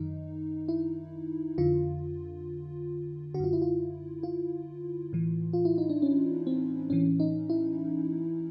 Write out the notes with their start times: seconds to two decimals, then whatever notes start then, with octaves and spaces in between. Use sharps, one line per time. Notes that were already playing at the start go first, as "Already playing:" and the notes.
Already playing: F#2 D#3 D#4
0.68 E4
1.58 F2 D3 F4
3.34 D3 F#4
3.40 F#2 F4
3.53 E4
3.62 F4
4.23 F4
5.13 A2 E3
5.53 F4
5.65 E4
5.78 D#4
5.89 D4
6.02 C#4
6.47 C4
6.90 A2 E3 C#4
7.20 D#4
7.50 E4